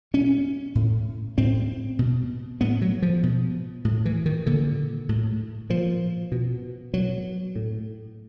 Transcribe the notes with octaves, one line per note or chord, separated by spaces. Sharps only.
B2 C#4
A2
A2 C4
B2
A2 B3
F#3
F3
B2
A2
E3
D#3
A#2 D3
A2
A#2 F3
B2
B2 F#3
A2